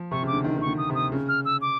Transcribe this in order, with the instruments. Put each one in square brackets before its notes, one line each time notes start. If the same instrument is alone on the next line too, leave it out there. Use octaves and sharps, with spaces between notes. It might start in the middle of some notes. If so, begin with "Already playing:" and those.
Already playing: [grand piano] F3
[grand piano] C3 [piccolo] C#6
[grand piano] C#3 [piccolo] D6
[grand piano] D3
D#3
D#3
[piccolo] C#6
[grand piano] D3
[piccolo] D#6
[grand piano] C3
[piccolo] D#6
[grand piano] C#3
[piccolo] F6
E6
D6